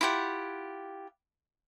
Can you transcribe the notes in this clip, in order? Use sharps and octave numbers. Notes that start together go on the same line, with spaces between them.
E4 F4 G4 F#5